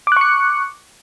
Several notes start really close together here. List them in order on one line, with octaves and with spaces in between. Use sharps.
D6 F#6 C#6 C#7